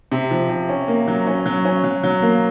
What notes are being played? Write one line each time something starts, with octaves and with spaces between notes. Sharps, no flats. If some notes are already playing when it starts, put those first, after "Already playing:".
C3
F3
C3
C#4
A#3
F#3
C#4
F#3
C#4
F#3
F#3
A#3